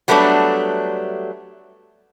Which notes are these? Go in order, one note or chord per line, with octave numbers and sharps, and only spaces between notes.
F#3 G3 A3 B3 D4